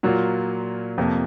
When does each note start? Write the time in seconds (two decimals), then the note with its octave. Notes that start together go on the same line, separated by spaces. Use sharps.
0.03 A#2 F#3 A#3 F4
0.98 F2 C3 F3 A#3